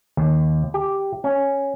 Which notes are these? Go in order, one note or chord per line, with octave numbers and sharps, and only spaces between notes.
D#2
G4
C#4